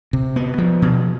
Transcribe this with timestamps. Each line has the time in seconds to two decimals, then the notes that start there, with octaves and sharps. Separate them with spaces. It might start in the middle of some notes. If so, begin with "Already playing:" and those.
0.13 C3
0.36 B3
0.58 F3
0.82 B2